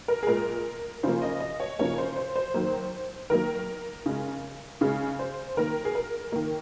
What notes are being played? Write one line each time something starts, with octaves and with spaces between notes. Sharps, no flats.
A#4
G#4
A#2 G#3 A#4
C#3 F3 A#3 C5
D#5
D#5
C#5
C#3 F3 A#3 C#5
C5
C5
C5
D#3 F#3 A#3
D#3 F#3 A#3 A#4
C#3 G#3
C#3 G#3 G#4
C5
D#3 A#3 A#4
G#4
A#4
D#3 A#3